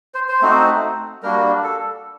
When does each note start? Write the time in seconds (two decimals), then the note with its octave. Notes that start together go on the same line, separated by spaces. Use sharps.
0.14 C5
0.29 C5
0.42 A3 C4 D#4 F#4
1.23 G3 A#3 D4 F#4 A#4
1.64 A4